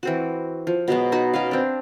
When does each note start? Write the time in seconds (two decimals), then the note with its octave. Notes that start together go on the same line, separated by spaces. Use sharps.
0.03 E3 C4 F#4
0.67 F3
0.88 B2 F#3 G#3 B3
1.12 D#4 F#4 F#5
1.34 B2 C#4 B4 F5
1.51 C4 D4